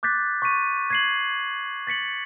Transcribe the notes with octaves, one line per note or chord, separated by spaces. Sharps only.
D6 F#6 G6 A6 B6
C#6 B6 D#7
G#6 C7 F#7
A6 B6 C#7 F#7